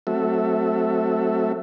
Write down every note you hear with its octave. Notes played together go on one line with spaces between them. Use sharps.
F#3 A3 C4 F#4 A4 E5